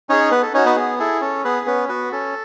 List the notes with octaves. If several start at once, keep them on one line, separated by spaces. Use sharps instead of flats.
C#4 D#4 G#4 C#5
B3 B4
A4
C#4 D#4 F#4 C#5
B3 B4
B3 G#4
E4 G#4 A4
C#4 A4
B3 G#4 B4
B3 C#4 B4
B3 F#4 B4
C#4 A4